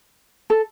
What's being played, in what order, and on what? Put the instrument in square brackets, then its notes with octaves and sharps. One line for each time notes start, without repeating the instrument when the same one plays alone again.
[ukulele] A4